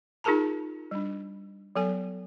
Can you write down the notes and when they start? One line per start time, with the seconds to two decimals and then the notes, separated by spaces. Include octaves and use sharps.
0.24 D#4 F4 G#4 A#4 A5 A#5
0.91 G3 D4
1.76 F#3 B3 A4 G#5